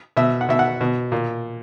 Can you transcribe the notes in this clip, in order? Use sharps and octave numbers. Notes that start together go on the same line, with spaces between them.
B2 E5
F#5
B2 E5
F#5
B2
A#2